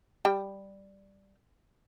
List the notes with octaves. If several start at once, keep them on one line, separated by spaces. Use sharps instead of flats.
G3 G5